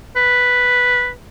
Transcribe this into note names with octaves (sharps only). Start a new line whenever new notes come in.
B4